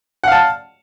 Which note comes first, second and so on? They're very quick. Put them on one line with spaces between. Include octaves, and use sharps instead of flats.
F#5 F5 A5